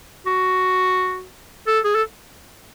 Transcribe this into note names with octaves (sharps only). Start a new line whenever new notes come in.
F#4
A4
G#4
A4